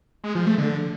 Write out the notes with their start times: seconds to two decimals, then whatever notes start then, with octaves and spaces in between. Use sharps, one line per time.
0.24 G#3
0.35 F3
0.47 A3
0.58 D3